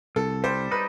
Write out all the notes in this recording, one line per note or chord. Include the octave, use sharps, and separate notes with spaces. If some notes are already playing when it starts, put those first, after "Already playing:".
C2 A4
G3 C5
D#4 B4